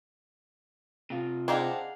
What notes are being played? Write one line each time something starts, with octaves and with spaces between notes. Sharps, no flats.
C3 F4
C4 D4 D#4 G#4 F5 F#5